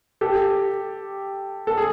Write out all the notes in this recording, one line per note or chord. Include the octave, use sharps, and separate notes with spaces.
G4 A4
A4
G#4